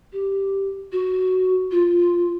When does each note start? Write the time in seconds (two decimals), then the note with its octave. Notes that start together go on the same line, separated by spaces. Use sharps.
0.13 G4
0.92 F#4
1.71 F4